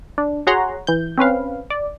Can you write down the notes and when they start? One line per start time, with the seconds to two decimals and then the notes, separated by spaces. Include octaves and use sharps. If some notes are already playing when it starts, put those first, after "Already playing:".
0.18 D4
0.47 F#4 G#4 C#5 F#5 A#5 C6
0.87 E3 G6
1.18 C4 C#4 B4 F5
1.70 D5